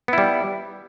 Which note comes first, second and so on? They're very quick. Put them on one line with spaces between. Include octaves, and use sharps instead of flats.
B3 E4 G3